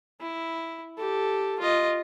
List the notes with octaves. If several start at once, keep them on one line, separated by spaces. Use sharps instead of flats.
E4
G4 A4
F4 D#5